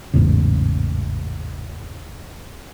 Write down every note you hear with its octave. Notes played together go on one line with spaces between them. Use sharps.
A1 E2 G#2 C#3